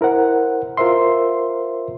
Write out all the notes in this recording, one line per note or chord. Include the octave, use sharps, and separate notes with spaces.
E4 A#4 C5 F#5
F4 A#4 C5 E5 C6